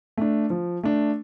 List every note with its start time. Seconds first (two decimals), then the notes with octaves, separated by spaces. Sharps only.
0.17 A3 D4
0.50 F3
0.83 A3 D4